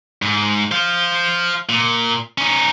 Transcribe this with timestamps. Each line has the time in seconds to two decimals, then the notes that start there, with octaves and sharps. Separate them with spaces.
0.22 G#2
0.72 C5 F5
1.69 A#2
2.38 C#4 D#4